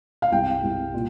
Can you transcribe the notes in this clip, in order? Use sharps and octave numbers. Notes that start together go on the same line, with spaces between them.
F5
C2 G5
C2
A#2